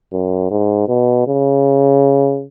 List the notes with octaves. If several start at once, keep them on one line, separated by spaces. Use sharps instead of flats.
F#2
G#2
B2
C#3